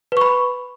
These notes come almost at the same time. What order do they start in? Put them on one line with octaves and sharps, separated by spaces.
B4 C#6 B5